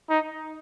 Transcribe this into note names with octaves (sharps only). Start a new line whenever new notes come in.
D#4